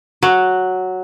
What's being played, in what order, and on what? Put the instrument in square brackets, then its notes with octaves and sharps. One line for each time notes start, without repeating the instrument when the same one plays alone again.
[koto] F#3